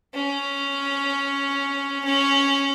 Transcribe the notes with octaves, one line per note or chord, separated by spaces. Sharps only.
C#4
C#4